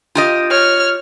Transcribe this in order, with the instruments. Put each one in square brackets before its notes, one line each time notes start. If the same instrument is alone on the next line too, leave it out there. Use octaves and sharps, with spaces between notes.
[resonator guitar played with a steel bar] F4 G4 D#5
[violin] C#5 F6